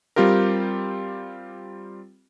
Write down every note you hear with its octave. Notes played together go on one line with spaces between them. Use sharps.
G3 C4 F4 G4 A#4